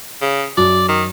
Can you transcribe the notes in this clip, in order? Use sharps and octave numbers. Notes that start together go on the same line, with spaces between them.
C#3
F#2 D5
D#3